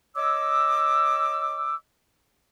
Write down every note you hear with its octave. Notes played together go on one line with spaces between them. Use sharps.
C#5 D#5 D6 E6